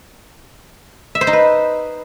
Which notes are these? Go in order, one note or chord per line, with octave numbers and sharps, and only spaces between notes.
E5
C5
D#4
B4